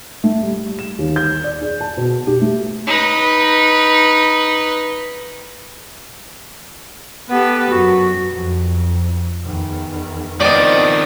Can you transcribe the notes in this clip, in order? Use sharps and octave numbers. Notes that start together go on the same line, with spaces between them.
A3
G3
E7
D#2
G6
D5
G#4
A5
B2
G4
A3
D#4 B4
B3 G4 A4 B4
F#2 F#4
F2
E2 D#3
D#3 F3 B3 C4 D5 D#5